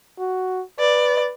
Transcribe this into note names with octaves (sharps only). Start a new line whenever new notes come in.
F#4
B4 D5